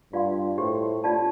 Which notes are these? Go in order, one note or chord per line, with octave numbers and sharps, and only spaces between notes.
G2 F4 D5 F5 C6
A2 G4 C5 G5 C6
D4 F4 D5 A5